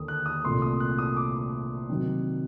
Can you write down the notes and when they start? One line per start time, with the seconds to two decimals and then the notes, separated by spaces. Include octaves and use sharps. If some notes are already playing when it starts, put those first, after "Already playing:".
Already playing: D#2 D3 D#6
0.08 F#6
0.26 D#6
0.44 C2 A#2 A3 C6
0.62 D#6
0.80 F#6
0.98 D#6
1.16 D6
1.89 C3 D#3 F#3 C4